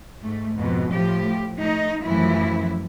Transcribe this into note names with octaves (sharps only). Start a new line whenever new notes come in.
G#2 A3
F2 G#2 B2
A2 F3 G4
A3 D#4
F#2 A2 E3 F3 E4